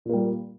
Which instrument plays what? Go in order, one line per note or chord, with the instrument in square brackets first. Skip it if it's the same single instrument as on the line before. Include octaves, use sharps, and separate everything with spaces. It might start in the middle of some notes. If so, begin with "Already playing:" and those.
[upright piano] A#2
A#3
G3